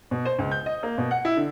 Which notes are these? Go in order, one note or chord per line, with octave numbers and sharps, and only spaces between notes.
B2
C5
C#2
G6
D#5
A#3
B2
F#5
E4
D3